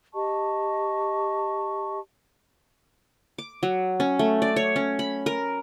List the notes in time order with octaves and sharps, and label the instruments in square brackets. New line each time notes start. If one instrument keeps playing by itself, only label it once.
[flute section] G4 D#5 A5 C#6
[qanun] D6
F#3
C#4
A3
D5
C#5
C#4
B5
A#4